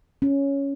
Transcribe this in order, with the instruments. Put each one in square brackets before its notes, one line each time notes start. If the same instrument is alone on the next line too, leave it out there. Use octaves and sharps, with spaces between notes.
[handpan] C#4